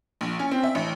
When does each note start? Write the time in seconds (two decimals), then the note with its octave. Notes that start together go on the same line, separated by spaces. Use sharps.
0.21 A#1
0.39 C#4
0.51 C4
0.63 E5
0.75 A1